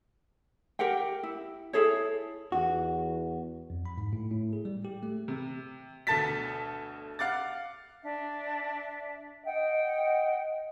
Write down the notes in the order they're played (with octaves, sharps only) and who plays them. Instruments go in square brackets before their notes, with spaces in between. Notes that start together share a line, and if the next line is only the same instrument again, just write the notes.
[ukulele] G4 A#4 F#5 G5
E4
E4 G#4 A4 C#5
[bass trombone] E2 [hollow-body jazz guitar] F#4
[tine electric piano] F2
B5
G#2
A2
A2
G#4
G3
G4
A3
[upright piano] C3
D2 B2 A4 A5 A6 B6
F5 F#5 D6 A6
[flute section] D4 E5
[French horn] D#5 [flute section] F#5 G5